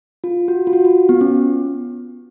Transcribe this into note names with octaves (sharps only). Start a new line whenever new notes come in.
F4
F#4
F4
F#4
F4
B3
C#4